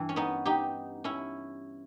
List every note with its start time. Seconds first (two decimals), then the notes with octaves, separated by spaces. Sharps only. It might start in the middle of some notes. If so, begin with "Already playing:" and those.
Already playing: G2 E3
0.09 C#4
0.16 B3 D#4
0.46 D#4 G4
1.04 C#4 E4